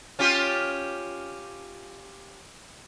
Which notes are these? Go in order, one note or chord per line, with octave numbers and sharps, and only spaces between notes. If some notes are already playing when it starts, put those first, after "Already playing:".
C#4 F4 G4